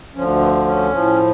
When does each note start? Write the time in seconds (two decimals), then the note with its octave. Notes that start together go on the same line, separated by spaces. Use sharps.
0.16 D2 D3 F3 C#4
0.40 B3
0.66 C#4
0.91 A2 F3